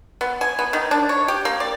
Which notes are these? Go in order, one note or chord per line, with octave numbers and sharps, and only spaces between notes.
B3
G#5
B3
D#3
D4
C#5
G4
A#3
D5